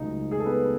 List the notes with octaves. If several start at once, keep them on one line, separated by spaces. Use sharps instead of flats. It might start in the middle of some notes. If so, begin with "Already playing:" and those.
Already playing: C#2 C#3 F#3 A3 D#4 D#5
G#4
A4
B3 B4